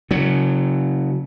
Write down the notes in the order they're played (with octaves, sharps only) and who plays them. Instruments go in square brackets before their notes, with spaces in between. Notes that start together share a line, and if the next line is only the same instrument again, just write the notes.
[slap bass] C#3 F#3